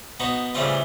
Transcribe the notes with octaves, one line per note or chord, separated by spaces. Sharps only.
B3 D#4 F#4
A2 C#3 E3 G3 C4 F4